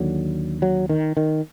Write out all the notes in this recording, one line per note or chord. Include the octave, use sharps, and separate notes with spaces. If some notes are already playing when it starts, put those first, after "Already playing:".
Already playing: D#2 D3 F#3
F#3
D#3
D#3